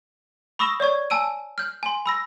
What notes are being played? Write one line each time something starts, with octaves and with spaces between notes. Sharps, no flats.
B5 C#6 D#6 E6 A#6 E7
C#5 D5 C#6 G#6
G#5 A5 E6 D7 D#7
F6 G6
G#5 C6
B5 E6 A#6